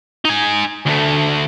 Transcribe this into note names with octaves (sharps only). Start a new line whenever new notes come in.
D#4 G#5
D2 A3